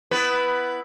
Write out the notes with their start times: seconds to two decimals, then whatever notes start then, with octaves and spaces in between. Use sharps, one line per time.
0.11 B3 E4 B4